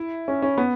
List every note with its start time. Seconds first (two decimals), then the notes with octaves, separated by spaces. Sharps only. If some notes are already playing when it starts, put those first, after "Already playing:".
Already playing: E4
0.28 C#4
0.42 C#4
0.58 B3